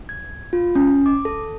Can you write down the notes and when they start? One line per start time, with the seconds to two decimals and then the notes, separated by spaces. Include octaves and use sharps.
0.09 G#6
0.53 F4
0.75 C#4
1.06 D6
1.25 A4